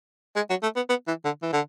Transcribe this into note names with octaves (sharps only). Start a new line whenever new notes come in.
G#3
F#3
A3
B3
B3
E3
D3
E3
D3